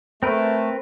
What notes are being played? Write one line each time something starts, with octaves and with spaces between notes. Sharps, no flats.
A3 C4 A#4 B4